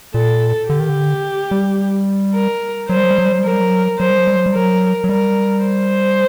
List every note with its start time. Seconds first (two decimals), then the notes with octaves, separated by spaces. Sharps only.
0.14 A#2 A4
0.69 D3 G4
0.80 D#3
0.90 D3
1.51 G3
2.35 A#4
2.89 F#3 C5
2.97 G3
3.03 F#3
3.11 G3
3.18 F#3
3.25 G3
3.32 F#3
3.39 G3
3.44 F#3 A#4
3.53 G3
3.61 F#3
3.99 F#3 C5
4.09 G3
4.18 F#3
4.27 G3
4.36 F#3
4.46 G3
4.54 F#3 A#4
5.04 F#3
5.09 G3 A#4
5.64 C5